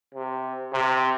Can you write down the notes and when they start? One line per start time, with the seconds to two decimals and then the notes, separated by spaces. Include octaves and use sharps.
0.14 C3
0.73 C3